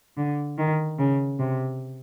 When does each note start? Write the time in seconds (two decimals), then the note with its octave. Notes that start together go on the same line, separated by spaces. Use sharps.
0.17 D3
0.58 D#3
0.99 C#3
1.39 C3